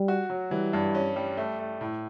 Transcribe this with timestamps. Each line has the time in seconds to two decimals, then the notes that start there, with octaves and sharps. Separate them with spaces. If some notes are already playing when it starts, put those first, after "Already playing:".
Already playing: G3
0.08 F#4
0.30 F#3
0.51 E3 G3
0.73 G2
0.95 C#4
1.16 G3
1.37 A3
1.59 A3
1.81 A2